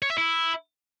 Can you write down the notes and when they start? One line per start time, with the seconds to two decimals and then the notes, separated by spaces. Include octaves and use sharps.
0.02 C#5
0.10 E5
0.18 E4